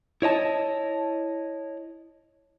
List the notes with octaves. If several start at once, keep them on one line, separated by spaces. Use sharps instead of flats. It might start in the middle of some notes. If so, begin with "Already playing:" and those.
E4 C#5 D#5 A5